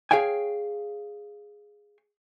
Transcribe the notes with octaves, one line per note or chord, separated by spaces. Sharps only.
G#4 C#5 F5 G5 G#5